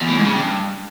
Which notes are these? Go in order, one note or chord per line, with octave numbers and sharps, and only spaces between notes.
E2
A2
G#2
C#3
G2